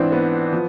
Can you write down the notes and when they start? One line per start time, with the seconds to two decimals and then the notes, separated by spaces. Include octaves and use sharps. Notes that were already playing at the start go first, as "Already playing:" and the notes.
Already playing: G#2 E3 C4 D4 E4
0.12 B3
0.53 F3